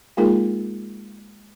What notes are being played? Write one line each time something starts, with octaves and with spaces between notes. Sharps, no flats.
G#3 A#3 D#4 F4 G#4 A#4